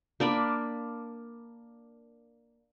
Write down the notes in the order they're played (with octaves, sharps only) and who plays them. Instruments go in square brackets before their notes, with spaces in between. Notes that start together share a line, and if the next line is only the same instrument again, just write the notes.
[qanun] A#3 D4 D5 B5